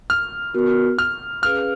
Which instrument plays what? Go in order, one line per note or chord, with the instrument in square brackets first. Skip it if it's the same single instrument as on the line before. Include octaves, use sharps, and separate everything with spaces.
[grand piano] F6
[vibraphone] B3 F#4 A#4
[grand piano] F6
[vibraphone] C#4 G#4 B4 F5 [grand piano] F6